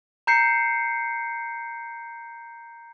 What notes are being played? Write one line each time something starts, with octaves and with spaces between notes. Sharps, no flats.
A#5 G6 C7 C#7